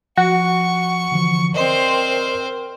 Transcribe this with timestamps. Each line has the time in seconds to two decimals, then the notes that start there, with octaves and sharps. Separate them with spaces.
0.17 F3 F#4 F#5 C#6
1.12 D3 E3 F3
1.54 C4 A#4 C5 D5 D#5 C6